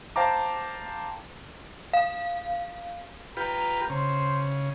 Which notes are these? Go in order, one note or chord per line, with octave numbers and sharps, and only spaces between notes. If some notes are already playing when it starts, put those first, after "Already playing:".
C5 F5 G5 A5 A#5 D6
F5
F4 G4 B4 A#5
C#3 C5